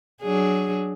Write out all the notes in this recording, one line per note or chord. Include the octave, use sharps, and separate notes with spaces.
F#3 D4 G#4